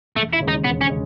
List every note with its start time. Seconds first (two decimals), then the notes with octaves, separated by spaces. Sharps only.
0.16 E1 A3
0.33 E4
0.40 D#2 C#3 G#3
0.48 D#4
0.64 E1 B3
0.81 C#4
0.89 C#3 G#3